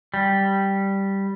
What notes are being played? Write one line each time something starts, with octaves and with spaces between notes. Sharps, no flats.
G3